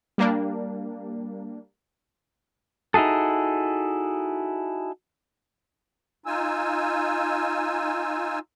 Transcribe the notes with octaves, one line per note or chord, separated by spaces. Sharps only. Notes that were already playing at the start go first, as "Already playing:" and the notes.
G3 A#3 D4
D#4 E4 F#4 G#4 A4
D#4 F4 G#5 E6